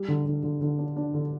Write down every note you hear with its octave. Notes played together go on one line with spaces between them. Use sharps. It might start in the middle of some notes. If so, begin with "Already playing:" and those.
Already playing: G3
D3
D3
D3
D3
D4
D4
D3